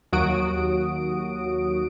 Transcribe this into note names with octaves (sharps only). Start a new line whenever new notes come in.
D#2 F#3 F#4 D#6 D7